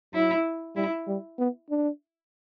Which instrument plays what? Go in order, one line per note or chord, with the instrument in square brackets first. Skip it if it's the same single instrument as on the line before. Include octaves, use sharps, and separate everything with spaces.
[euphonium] F#3 [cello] E4
[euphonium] G3 [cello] E4
[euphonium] G3
B3
D4